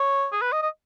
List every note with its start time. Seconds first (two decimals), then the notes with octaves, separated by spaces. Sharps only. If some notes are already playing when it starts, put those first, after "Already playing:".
Already playing: C#5
0.32 G#4
0.42 B4
0.52 D#5
0.62 D#5